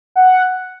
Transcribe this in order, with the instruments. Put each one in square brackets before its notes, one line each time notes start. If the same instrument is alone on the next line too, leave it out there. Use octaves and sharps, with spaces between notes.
[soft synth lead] F#5